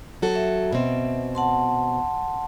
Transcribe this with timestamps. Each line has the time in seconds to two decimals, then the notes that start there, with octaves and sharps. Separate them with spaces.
0.22 F#3 F#4 A4
0.35 E5
0.73 B2 C4
1.35 F#5 A5 C6